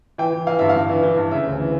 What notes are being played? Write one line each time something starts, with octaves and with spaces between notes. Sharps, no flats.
E3 G5
E3
E3 F5
G2 E5
F5
G2
E3
E3
G2
C#3 E5
D2
E3